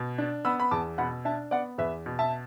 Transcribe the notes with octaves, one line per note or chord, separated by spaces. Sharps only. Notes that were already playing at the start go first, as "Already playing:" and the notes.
Already playing: B2
D4
B3 B5 E6
B5
E2 A5 D6
B2 F#5 B5
D4 E5 A5
B3 D5 F#5
E2 B4 E5
B2
E5 A5